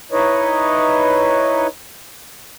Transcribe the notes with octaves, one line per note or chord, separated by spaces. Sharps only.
D#4 E4 B4 C#5 D#5